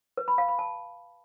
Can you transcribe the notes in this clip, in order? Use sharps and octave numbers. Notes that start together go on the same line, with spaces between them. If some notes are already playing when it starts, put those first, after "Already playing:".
B4
B5
F5
B5
A5